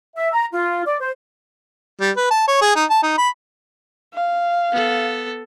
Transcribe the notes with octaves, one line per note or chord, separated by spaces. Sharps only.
E5
A#5
F4
D5
C5
G3
B4
A5
C#5
G#4
D#4
A5
D#4
B5
F5
B3 A4